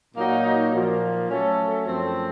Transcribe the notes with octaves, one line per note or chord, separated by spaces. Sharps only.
A#2 F#3 A#3 D#4 F#4
A#2 F3 A#3
F#3 A3 C#4 A4
F#2 F3 A3 C4